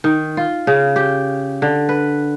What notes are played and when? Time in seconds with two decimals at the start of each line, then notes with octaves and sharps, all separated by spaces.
0.04 D#3
0.37 F4
0.67 C#3
0.96 G4
1.62 D3
1.89 B4